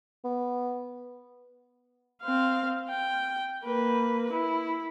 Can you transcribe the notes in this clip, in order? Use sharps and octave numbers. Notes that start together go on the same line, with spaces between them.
B3
C4 F5
G5
A#3 B4
E4